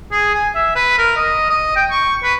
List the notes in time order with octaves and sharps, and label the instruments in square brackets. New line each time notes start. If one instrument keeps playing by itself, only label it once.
[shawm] G#4
G#5
E5
B4
A#4
D#5
D#5
G5
C#6
B4